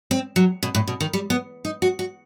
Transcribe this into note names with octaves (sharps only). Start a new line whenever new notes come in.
C4
F#3
B2
A2
B2
D#3
G3
B3
D#4
F#4
F#4